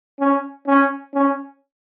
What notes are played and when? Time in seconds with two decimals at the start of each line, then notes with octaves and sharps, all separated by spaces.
0.19 C#4
0.67 C#4
1.14 C#4